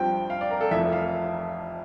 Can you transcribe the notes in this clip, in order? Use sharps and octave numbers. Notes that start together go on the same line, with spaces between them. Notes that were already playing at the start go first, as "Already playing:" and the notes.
Already playing: G2 F3 C4 G5
F5
D5
A#4
A4
F1 F2 E3 E5
F5